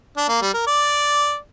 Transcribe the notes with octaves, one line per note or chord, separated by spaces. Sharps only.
D4
A#3
G3
A#4
D5